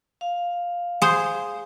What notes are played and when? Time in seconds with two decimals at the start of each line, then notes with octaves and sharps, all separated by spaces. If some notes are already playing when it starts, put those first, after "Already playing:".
0.21 F5
1.02 G#4 C5